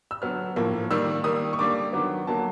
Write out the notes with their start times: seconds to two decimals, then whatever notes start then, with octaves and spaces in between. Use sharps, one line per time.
0.11 E6
0.22 D3 F#3 B3 F6
0.56 A2 F3 A#3
0.91 D#3 G3 A#3 E6
1.24 D#3 G3 A#3 D#6
1.53 C#6
1.58 D3 G3 A#3 D6
1.93 D#3 F#3 B3
2.27 D3 F#3 A#3 A5